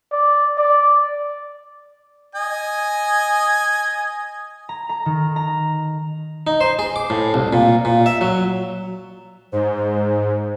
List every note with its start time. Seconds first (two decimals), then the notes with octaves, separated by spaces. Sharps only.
0.12 D5
0.58 D5
2.35 D#5 G#5
4.69 A#5
4.89 A#5
5.06 D#3
5.36 A#5
6.47 D#4
6.61 C5
6.79 G#4
6.96 D6
7.10 A2
7.34 C2
7.53 A#2
7.85 A#2
8.06 E5
8.21 F#3
9.52 G#2 C5